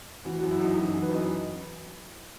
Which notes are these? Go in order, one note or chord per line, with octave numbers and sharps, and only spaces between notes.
E3 F#4
F#2 F#4
E4
F#2 D#4
E3 F#4
E3
B4
F#2 D#5